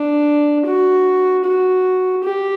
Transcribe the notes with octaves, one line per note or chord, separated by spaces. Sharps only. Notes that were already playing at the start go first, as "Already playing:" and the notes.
Already playing: D4
F#4
F#4
G4